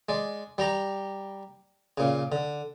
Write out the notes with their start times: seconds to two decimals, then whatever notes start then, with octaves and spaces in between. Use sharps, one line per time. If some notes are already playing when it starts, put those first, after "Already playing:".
0.09 G#3 D5
0.58 G3 G4 A#5
1.98 A#2 C#3
2.32 D3